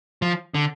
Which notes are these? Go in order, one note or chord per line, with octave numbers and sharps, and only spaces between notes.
F3
D3